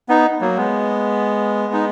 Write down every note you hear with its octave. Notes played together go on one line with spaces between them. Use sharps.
B3 D#4
F#3 A#3
G#3 B3
D#4